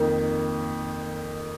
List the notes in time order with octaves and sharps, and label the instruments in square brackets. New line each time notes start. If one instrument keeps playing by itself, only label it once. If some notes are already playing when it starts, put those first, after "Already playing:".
Already playing: [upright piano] F2 D#3 A#3